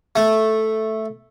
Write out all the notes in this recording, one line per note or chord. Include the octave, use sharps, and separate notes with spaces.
A3